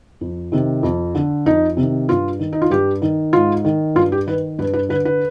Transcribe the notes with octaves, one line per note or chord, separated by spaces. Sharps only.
F2
C3 D#3
F2
D3
F2 D#4
C3 D#3
G2 F4
D#3
D#4
F4
G2 G4
D#3
G#2 F4
D#3
G2 F4
G4
D#3 B4
G2 B4
B4
D3 B4
B4